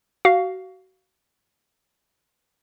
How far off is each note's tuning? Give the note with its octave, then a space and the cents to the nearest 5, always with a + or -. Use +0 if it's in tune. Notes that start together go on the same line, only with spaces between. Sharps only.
F#4 +25 F5 +0